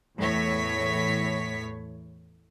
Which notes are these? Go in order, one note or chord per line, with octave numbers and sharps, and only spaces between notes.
E2 A2 C#5 B6